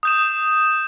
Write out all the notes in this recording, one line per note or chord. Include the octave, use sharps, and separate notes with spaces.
D#6 G6 E7